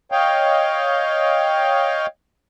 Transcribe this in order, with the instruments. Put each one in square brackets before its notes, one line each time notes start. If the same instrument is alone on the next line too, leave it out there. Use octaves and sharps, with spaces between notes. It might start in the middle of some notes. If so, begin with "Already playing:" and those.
[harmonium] C#5 D#5 F5 G5